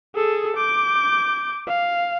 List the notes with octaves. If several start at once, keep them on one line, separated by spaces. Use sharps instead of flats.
G#4 A4
D6 G6
F5